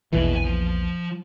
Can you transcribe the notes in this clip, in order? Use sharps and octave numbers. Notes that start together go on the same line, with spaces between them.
A#1 E2 B2 E3
B4 G#5
F3